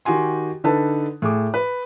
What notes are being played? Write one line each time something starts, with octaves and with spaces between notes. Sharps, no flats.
D#3 F#4 G4 G#5 C6
D3 D#4 A4 B4 A5
A2 G#4 D6
B4